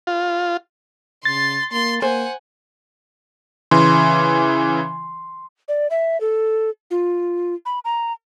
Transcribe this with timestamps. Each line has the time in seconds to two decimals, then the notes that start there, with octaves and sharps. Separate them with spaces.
0.07 F4
1.25 C#3 C6 A6
1.72 A#3 C6
2.02 A#3 C5 F#5 G#5
3.71 C#3 E3 C6
5.68 D5
5.90 E5
6.21 A4
6.91 F4
7.66 B5
7.85 A#5